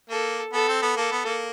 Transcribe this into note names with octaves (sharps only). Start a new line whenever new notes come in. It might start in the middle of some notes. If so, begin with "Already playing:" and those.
A#3 A4
B3 A4
C4
B3
A#3 A4
B3
A#3